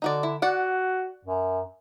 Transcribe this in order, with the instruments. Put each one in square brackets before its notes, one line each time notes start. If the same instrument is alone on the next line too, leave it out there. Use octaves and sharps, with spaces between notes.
[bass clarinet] D3 [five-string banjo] D#4 F#4 D5
[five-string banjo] E4
[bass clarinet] F#4 [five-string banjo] D5 F#5
[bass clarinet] F#2